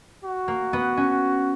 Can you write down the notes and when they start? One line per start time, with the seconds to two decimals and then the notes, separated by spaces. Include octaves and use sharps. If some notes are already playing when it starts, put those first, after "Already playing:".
0.24 F#4
0.48 A#3
0.73 B3
0.97 C#4